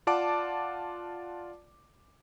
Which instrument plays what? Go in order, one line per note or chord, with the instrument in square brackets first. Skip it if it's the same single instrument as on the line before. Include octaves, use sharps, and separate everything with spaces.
[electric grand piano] F4 D5 F#5 A5 D6 D7